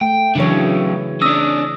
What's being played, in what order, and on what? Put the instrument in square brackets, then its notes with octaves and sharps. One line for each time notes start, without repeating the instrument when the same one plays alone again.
[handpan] A3 [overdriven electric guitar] G5
[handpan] C#3 E3 C#5 [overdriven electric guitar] F#3 D4
[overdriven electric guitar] C#4 D4 [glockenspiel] D#6 E6 A#6